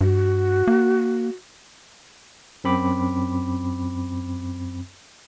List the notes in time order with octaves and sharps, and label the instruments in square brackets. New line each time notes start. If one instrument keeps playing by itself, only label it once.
[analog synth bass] G2 [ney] F#4
[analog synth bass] A#3
[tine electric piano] F#2 C4 B5 D6